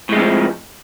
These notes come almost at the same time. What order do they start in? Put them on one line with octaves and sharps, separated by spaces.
A2 G#3 F2 F3